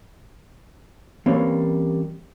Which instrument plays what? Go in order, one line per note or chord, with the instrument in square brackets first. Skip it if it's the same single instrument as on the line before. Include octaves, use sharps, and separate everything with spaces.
[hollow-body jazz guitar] E3 G3 A#3 C4 C#4